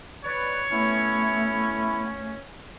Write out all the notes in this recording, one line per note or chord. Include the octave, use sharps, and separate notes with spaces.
B4 C#5 D5
A3 B3 C#4 E4